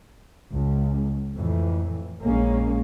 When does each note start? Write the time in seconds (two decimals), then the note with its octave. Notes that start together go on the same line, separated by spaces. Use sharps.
0.51 C#2
1.35 F2 A2 E3
2.22 A#1 G#3 A#3 C#4